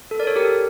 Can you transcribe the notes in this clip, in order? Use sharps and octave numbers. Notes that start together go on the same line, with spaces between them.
A4
A#4 D5
A4 C#5
G4 A#4
A4